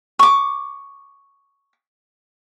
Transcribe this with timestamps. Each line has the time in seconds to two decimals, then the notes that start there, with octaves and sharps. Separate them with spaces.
0.19 C#6 D6